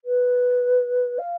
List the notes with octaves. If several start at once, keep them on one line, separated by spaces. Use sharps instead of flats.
B4
F5